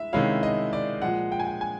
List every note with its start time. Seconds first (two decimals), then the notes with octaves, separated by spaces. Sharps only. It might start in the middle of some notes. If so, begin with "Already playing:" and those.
Already playing: G#3 E4 E5
0.13 C3 D#3 G#3 C#4 E4 F5
0.43 D#5
0.73 D5
1.02 A#2 F3 G#3 F#5
1.32 G5
1.40 G#5
1.47 G5
1.61 G#5